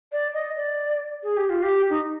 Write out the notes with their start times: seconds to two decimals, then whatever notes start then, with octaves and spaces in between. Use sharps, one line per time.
0.12 D5
0.34 D#5
0.57 D5
1.23 G#4
1.37 G4
1.50 F4
1.63 G4
1.90 D#4